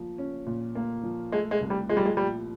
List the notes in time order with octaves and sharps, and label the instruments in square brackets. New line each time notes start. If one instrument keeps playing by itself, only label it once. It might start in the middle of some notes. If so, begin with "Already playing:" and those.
Already playing: [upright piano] A#2 F3 A#3
C#4
A#2
A#3
F3
[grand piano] G#3 [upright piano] A3
[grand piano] G#3
[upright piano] C2
[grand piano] G3
[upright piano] F3 [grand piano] G#3
[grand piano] G3
G#3
[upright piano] A#2 [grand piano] G3